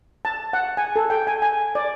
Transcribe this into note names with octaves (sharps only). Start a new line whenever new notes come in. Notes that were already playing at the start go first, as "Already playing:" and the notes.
A5
F#5
G#5
A4
G5
G#5
G#5
D5